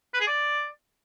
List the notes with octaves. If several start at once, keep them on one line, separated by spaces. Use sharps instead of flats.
B4
G#4
D5